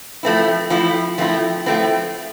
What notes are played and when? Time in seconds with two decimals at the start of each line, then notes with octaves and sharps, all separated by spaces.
0.23 F3 A3 C4 E4
0.70 F3 A3 C4 E4
1.18 F3 A3 C4 E4
1.66 F3 A3 C4 E4